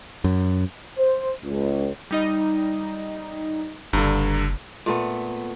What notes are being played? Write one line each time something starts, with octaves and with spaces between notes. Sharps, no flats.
F#2
C5
C#2
G3 D#4 D#5
F#1 G2 D3 A#5
A#2 A3 B3